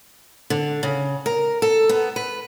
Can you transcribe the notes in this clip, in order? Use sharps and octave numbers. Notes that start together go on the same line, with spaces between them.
D3
C#3
A#4
A4
B3
B4